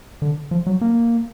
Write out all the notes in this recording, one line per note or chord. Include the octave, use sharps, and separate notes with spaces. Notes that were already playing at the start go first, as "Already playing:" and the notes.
D3
F3
F#3
A#3